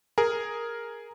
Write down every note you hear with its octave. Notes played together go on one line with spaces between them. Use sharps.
G#4 A#4